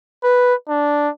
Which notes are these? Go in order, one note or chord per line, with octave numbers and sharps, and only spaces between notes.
B4
D4